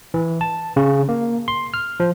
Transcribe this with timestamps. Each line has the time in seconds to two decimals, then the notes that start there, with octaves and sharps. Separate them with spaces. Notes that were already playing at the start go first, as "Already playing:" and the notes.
0.14 E3
0.41 A5
0.76 C#3
1.09 A#3
1.48 C6
1.74 F6
2.00 F3